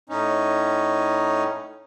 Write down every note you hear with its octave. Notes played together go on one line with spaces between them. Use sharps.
A2 C#4 D#4